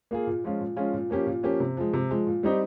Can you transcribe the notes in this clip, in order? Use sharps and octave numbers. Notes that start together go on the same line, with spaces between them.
A#3 F4 G#4
A#2
F3 G#3 C#4 F4
A#2
F3 G#3 C#4 F4
A#2
F3 A#3 C#4 G4
A#2
F3 A#3 C#4 G4
C3
F3 G#3
C3
F3 G#3
A#2
G3 C4 D#4 G4